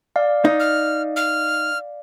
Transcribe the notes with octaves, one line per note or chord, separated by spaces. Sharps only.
D5 F5
D#4
F6
F6